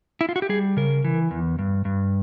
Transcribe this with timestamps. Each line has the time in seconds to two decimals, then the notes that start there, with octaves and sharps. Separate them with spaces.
0.21 E4
0.29 F4
0.36 F#4
0.42 G4
0.49 G3 G#4
0.77 C#3 A#4
1.04 E3
1.31 E2
1.59 G2
1.85 G2